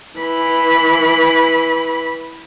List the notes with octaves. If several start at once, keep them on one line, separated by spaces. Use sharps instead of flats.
E3 B5